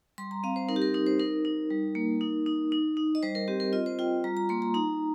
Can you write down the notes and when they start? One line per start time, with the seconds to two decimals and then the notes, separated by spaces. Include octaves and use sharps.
0.18 G3 C6
0.31 A#5
0.44 C4 F5
0.56 C5
0.69 D#4 A#4
0.76 G4
0.82 A#4
0.94 D#4 A#4
1.06 C5
1.19 D#4 A#4
1.45 D#4
1.70 G3
1.95 A#3
2.21 D#4
2.46 D#4
2.72 D#4
2.97 D#4
3.15 D#5
3.23 G3 C5
3.35 A#4
3.48 C4 G4
3.60 A#4
3.73 F4 D#5
3.86 C5
3.99 F4 G5
4.24 G3 A#5
4.37 A#5
4.49 A#3 C6
4.62 A#5
4.74 D#4 A#5